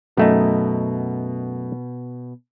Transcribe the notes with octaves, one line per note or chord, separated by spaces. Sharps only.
F#2 B2 A3 D#4